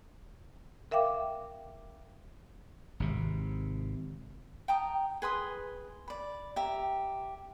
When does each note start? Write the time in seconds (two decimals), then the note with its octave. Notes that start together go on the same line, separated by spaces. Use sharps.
0.91 A#4 E5 F5 G5 D6
3.00 G#1 C3
4.68 G5 A5 A#5 D#6
5.22 G#4 B4 C6 D#6
6.08 D5 B5
6.56 G4 E5 A#5